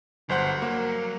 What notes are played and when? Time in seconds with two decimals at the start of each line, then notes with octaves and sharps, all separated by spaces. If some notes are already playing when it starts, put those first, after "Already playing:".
0.29 G1 F#3 C5 F#5
0.62 A#3